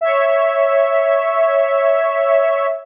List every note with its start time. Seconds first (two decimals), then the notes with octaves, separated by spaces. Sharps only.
0.01 C#5 E5